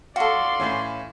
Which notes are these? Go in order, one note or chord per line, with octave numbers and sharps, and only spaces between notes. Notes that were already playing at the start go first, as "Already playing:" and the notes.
F#4 A4 D5 F5 C6
A2 E3 C#4